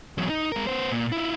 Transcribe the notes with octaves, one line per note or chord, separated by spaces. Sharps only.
E2 F#3
D#4
G#3 A#4
B3 C5
A#2
E4 F4